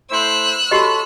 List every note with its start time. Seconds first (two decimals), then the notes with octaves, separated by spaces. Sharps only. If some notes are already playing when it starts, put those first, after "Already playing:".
0.10 A3 E4 C5 E6 F#6
0.71 F#4 G4 A4 C#5 D#5 B5